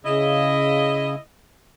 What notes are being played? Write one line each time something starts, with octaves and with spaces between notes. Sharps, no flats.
C#3 E4 D#5